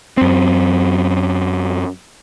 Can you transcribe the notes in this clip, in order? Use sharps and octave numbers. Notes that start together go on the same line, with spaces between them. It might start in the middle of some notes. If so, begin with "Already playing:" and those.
F#2 C4